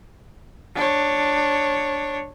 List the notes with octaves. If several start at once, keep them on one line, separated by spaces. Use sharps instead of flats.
D4 C#5